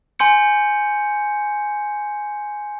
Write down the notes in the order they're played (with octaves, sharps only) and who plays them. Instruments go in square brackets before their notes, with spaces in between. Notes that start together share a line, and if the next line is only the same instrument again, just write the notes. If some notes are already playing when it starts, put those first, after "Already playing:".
[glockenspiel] G#5 C6 G6 C#7